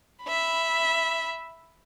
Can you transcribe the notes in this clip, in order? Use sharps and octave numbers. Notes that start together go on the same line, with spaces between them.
E5 B5